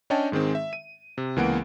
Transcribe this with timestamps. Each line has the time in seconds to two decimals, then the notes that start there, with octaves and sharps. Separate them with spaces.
0.10 C#4 D4 C#5 D#5 G5 A5
0.32 G#2 D#3 G#3 C4
0.55 E5
0.73 D#7
1.18 C3
1.36 C#2 E3 A#3 B3 F#5 D7